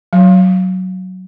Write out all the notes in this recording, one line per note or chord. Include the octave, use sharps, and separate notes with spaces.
F#3